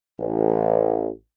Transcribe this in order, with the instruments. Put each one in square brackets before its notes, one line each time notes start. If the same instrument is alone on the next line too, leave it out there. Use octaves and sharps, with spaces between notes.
[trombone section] A1